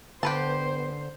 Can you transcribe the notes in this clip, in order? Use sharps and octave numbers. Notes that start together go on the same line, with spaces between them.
D3 B3 G4 B4 C5 A5